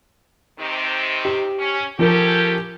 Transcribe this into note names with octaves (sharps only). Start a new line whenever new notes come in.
C3 D#3 C4
G4
C#4
F3 C#4 G4 A4 A#4